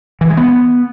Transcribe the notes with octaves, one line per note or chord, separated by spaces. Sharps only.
E3
G#3
B3